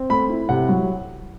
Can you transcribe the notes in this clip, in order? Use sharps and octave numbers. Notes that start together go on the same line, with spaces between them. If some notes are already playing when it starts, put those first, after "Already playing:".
Already playing: C4
A3 B5
E4
C3 F#5
F#3